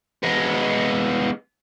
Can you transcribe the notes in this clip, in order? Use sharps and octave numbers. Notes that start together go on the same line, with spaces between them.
G#3 B3